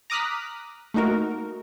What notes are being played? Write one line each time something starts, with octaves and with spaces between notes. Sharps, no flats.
A#5 D6 D#6 F6 F#6 B6
A3 A#3 D#4 F#4 A#4